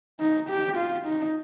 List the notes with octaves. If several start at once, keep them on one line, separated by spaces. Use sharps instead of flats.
D#4
G4
F4
D#4